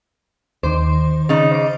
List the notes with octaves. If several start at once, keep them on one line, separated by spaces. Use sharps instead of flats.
D#2 D#3 C5 D6
C#3 D#4 A6
C5 D#5 D6